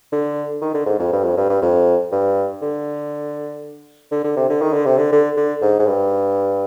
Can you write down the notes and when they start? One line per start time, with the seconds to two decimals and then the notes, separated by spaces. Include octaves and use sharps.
0.12 D3
0.62 D#3
0.74 D3
0.86 G#2
0.99 F2
1.12 G2
1.24 F2
1.37 G2
1.49 G2
1.62 F2
2.12 G2
2.62 D3
4.11 D3
4.24 D3
4.37 C3
4.49 D3
4.61 D#3
4.73 D3
4.85 C3
4.97 D3
5.12 D3
5.37 D3
5.62 G#2
5.79 G#2
5.87 G2